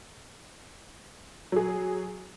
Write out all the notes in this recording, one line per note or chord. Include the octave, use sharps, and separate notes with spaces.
F#3 G#4